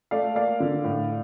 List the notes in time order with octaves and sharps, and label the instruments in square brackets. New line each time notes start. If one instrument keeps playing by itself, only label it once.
[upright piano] A3 D5 F5
A#3 D5 F5
D3
A2